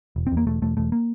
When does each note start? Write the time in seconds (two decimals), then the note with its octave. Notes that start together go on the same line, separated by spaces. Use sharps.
0.16 E1
0.27 C4
0.32 E2
0.37 A#3
0.47 E1 A3
0.62 E1 A3
0.77 E1 A3
0.92 A#3